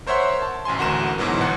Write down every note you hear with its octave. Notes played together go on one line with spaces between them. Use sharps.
A#4 C5 C#5 E5 F#5 C6
A5
A1 F#2 G#5 C6
A1 D2 F#4 A#4 E7
G#2 B2 E3 F#3
G1 F#5